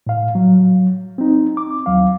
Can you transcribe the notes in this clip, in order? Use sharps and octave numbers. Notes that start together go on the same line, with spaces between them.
A2 F5
F#3
C4 D#4
D6
D#2 F#3 F5